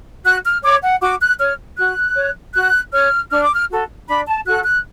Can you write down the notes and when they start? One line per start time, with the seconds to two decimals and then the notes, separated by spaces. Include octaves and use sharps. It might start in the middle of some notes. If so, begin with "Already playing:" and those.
0.24 F#4 F#6
0.44 F6
0.63 C#5 D6
0.82 F#5
1.01 F#4 D6
1.20 F#6
1.39 C#5 F6
1.78 F#4 F#6
2.16 C#5
2.54 F#4 F#6
2.93 C#5 F6
3.31 D4 F6
3.42 D6
3.53 F6
3.69 F#4 A4
4.07 D4 B5
4.27 A5
4.46 F#4 A4 F#6
4.65 F#6